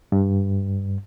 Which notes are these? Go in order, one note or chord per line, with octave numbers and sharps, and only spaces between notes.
G2